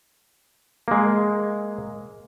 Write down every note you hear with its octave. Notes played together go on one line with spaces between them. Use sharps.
G#3 A#3